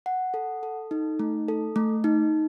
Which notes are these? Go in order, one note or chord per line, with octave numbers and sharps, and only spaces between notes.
F#5
A4
A4
D#4
A3
A4
A3
D#4